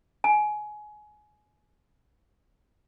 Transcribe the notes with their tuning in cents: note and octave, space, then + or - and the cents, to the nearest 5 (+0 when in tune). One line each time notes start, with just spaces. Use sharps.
G#5 +25